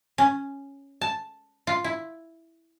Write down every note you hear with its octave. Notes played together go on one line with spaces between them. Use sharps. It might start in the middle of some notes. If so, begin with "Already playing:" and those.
C#4
A5
F4
E4